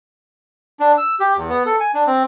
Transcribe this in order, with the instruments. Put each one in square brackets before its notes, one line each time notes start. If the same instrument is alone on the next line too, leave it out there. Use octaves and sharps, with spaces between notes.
[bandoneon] D4
E6
G4
E2
B3
A4
G#5
D4
C4